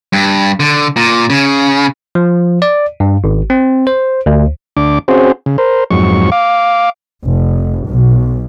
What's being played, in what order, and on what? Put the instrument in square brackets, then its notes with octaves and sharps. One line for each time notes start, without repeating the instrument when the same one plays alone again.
[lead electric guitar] G2
D3
A#2
C#3
[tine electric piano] F3
D5
G2
G#1
C4
C5
D2
[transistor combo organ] D2 D4 D6
C4 C#4 F#4 G#4 C5
C#3
A#4 C5
F2 G#2 F#3 C#6
F5 D6
[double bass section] F1
B1